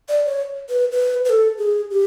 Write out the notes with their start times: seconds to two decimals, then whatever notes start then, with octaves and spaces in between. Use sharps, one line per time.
0.09 D5
0.26 C#5
0.70 B4
0.92 B4
1.25 B4
1.30 A4
1.58 G#4
1.91 G4